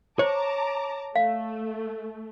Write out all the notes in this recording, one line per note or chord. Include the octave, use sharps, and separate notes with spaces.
C5 C#5 A5 A#5 D6
A3 F5